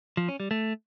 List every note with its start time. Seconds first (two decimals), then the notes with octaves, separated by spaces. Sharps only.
0.17 F3
0.28 C#4
0.40 G3
0.51 A3